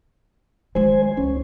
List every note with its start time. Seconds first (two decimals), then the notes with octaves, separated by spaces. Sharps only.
0.75 D#3 G#3 C5 G#5
1.17 C#2 C#4